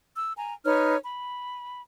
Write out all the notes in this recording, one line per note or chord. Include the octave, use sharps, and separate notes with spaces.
E6
G#5 A#5
D#4 B4 C#5 F6
B5